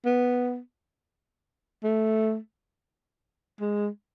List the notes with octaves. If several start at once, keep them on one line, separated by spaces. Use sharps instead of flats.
B3
A3
G#3